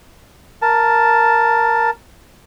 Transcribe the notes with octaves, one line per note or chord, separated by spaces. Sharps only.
A#4 A5